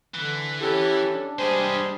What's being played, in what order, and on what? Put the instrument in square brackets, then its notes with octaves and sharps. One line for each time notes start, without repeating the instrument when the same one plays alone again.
[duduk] D3 [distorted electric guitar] E3
[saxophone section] C#4 A4 [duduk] E4 [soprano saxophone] G4
[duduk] D4
[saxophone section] G3 G#3 C5 [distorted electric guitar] G4 D#5 [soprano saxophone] G#5